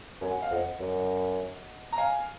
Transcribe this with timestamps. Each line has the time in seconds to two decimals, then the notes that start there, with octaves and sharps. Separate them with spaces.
0.21 F#2 G#5
0.31 F#5
0.42 F5
0.51 F2 D#5 F#5
0.80 F#2
1.92 A#5
1.98 F5 G#5